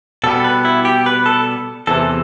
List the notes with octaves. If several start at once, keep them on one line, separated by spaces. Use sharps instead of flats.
B2 G3 B3 A4
B4
E4
G4
B4
A4
E2 C3 E3 A4